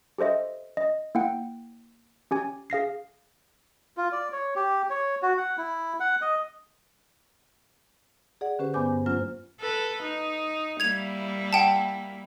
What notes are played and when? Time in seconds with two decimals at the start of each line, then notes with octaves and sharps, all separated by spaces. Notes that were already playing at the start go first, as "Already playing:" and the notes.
0.18 G4 A4 C5 D#5 E5
0.77 D#5
1.15 A#3 E4 F#5 G5
2.31 C#4 G4 G#5
2.70 G#4 F5 A#6 C7
3.97 F4
4.12 D5
4.32 C#5
4.56 G4
4.90 C#5
5.22 F#4
5.37 F#5
5.58 E4
6.00 F#5
6.22 D#5
8.41 G#4 D5 F#5
8.59 D3 C#4 G4 B4 C5
8.74 G2 B3 C5 G#5 D6 G6
8.93 G2
9.06 F#3 A#3 C#4 F4 C5 F6
9.60 A4 B4
10.02 D#4
10.80 G3 A#3 E4 G#6 F7
11.53 F#5 G5 A5